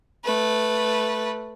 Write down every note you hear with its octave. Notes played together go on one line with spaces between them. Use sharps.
A3 B4